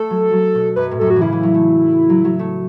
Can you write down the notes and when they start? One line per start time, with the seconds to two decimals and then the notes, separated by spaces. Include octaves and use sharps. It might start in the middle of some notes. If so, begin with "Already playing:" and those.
Already playing: A3 A4
0.10 F#3
0.33 F#3
0.55 B2
0.76 F#2 B4
0.91 A2
0.99 F#2 A4
1.07 A2 F#4
1.16 E3
1.21 C#3 E4
1.32 E3
1.43 F#3
1.54 A3
2.09 F#3
2.25 F#3
2.39 A3